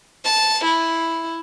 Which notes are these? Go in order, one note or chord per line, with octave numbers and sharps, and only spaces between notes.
A5
E4